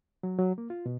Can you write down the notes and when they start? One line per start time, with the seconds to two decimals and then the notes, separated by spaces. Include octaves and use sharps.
0.23 F#3
0.39 F#3
0.58 A#3
0.70 F4
0.86 B2